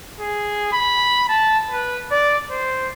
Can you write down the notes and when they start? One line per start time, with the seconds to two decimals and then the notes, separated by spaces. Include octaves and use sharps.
0.20 G#4
0.73 B5
1.29 A5
1.71 B4
2.11 D5
2.51 C5